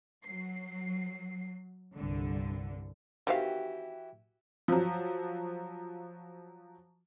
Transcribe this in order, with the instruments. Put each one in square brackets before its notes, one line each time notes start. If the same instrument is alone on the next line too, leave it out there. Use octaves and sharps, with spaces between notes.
[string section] F#3 C7
C2 G2 D3
[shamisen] D#3 C4 F5 [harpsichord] E3 F#4 G4
[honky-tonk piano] F3 F#3